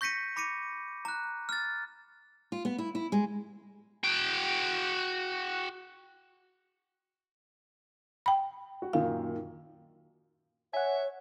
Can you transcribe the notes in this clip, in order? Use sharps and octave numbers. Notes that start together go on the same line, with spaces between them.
C#6 G6 A#6 B6 C#7 D#7
B5 D6 A#6 C#7 D#7
A#5 F#6
F6 A6
F4
B3
E4
E4
G#3
F#4 G5
G5 B5
F#4
F#2 A#2 D#3 F5
C#5 E5 F#5 G#5